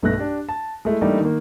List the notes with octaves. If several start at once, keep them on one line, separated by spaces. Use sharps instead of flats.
B1 G2 A3 B3 F#6 A#6
D4 G4
A5
G#3 A3 E4
E3 G3 A3 A#3 D4 D#4
D#3 A#3